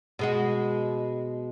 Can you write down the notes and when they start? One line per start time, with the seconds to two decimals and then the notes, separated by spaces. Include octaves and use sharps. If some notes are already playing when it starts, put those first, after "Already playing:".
0.19 B2 G#3 F#4